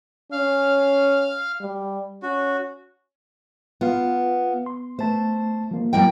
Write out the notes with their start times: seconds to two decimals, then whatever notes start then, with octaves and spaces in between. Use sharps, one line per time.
0.32 C#4 F5 F6
1.61 G3
2.23 C#4 F#4
3.81 B3 F4 F5
4.66 C6
4.99 A3 C5 A5
5.71 F3 G3 A#3
5.93 F#2 A#3 E4 G5